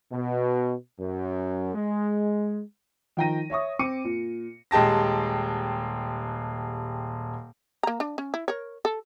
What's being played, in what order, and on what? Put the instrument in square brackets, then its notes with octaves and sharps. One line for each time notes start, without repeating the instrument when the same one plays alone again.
[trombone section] B2
F#2
G#3
[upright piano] D#3 F3 G5 A#5 A#6 D#7
C#5 E5 C#6 D#6
C4 D6 C#7 D#7
A#2
D#1 G#3 G4 A5 A#6
[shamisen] A#3 A#5
D4
C#4
E4
A#4 C#5
A4